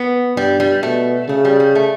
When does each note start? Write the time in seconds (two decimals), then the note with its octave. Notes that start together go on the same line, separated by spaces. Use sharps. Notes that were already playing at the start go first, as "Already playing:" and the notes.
Already playing: B3
0.36 G2 G3
0.60 G3
0.83 B2 A3
1.29 C#3 A3
1.45 G3
1.60 G3
1.75 A3